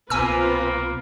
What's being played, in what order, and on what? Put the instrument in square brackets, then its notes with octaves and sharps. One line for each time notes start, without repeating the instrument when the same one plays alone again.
[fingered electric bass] C2 B2 [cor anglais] A#3 [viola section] C4 F4 B4 [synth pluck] G#5 E6